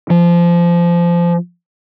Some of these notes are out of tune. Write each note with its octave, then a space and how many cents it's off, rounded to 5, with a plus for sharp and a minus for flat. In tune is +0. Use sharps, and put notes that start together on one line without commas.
F3 -20